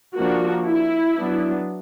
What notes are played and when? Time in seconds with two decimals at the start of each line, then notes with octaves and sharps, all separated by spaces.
0.15 F3 A#3 D4 F#4
0.67 E4
1.17 F#3 B3 D4